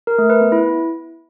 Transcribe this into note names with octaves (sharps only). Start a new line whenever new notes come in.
A#4
A3
B4
B3
E4